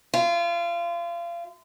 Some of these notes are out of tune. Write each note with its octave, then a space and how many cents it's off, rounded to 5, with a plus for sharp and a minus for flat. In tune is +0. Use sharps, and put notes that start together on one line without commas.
F4 -30